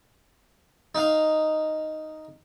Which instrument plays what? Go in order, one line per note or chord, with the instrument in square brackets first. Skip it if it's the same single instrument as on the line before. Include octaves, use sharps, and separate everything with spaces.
[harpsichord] D#4 F5